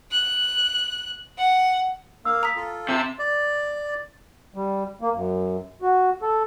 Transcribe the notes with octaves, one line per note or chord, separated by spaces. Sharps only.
F#6
F#5
A#3 F5 E6
A#5 D#6 B6
F4 A4
C3 A5 E6
D5
G3
A#3
F#2
F#4
A4